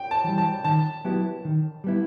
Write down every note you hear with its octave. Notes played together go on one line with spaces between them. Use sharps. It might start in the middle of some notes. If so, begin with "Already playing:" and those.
Already playing: G5
A5
E3 G3
A5
D#3 A5
F#3 B3 E4 G4
D#3
G3 B3 E4